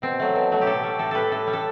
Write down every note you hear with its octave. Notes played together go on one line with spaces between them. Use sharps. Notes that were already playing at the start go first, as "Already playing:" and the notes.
B2 C4
F#3 A3
B2
F#3 A3
G4
A2 A4
G3
A2 A4
G3 A4 B4
A2 A4
G3
A4